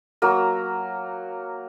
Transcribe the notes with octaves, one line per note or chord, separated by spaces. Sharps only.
F#3 A#3 A#4